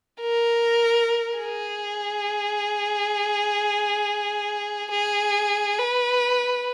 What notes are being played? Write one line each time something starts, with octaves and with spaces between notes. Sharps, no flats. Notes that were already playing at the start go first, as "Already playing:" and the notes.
A#4
G#4
G#4
B4